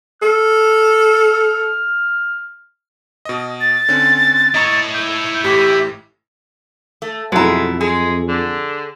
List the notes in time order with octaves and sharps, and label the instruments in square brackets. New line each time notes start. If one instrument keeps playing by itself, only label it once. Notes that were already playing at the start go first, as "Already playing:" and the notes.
[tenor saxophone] A4 [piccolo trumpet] F6
[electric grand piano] B2 D#5
[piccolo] A6
[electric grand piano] D3 C4 C#4
[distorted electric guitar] E4 C#5 [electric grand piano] D#5 A#5 C#6
[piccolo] G6
[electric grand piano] A1 A2 [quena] G4 [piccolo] B6
[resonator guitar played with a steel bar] A3
[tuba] F2 [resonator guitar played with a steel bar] B2 E4 [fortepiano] F#3 A4 A#5 [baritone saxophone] G#3
[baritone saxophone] G#3 [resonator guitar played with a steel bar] G#4
[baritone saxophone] D3